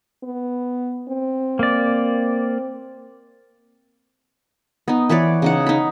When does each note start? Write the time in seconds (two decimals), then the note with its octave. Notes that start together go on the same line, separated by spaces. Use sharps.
0.23 B3
1.09 C4
1.59 A#3 D5
4.88 B3 D#4
5.09 E3 B4 C#5 D5
5.42 C#3 D#4 F#5
5.66 D#4 B5